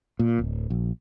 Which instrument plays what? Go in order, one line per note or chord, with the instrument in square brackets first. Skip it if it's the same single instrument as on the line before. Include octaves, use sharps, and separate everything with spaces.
[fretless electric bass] A#2
D1
A#1